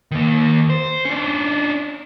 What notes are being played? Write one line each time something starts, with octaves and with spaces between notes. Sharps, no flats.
D#3 A#3
C5
C#4 D4